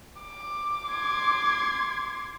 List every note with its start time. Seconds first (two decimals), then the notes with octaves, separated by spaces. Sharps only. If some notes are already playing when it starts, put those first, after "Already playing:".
0.22 D6
0.89 C6 G#6